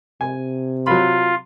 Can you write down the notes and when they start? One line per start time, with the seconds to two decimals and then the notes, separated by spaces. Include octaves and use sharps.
0.21 C3 G#5
0.87 F#3 F4 B5